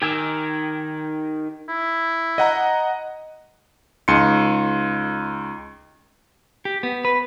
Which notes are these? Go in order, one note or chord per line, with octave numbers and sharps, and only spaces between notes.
D#3 G4 G#5 E6
E4
D#5 F#5 A#5
C#2 D#4 C6 C#7
G4
B3
B4